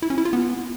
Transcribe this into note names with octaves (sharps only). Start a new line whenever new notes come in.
E4
C#4
E4
F4
B3